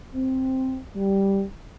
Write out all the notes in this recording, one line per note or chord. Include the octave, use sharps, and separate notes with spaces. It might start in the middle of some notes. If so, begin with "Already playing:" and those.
C4
G3